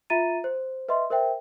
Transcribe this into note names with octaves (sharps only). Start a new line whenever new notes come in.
F4 E5 A#5 A6 D#7
C5
B4 D#5 E5 C6
A#4 C5 E5 G5